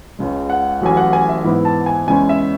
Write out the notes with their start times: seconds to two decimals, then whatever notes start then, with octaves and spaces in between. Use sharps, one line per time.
0.19 C#2 C#3 G#3
0.50 F#5
0.81 A1 A2 F#3 G#5
0.97 F#5
1.13 G#5
1.29 E5
1.44 G#2 E3 B3 E4
1.65 A5
1.86 G#5
2.07 E2 C#3 G#3 C#4 E4 G#5
2.29 E5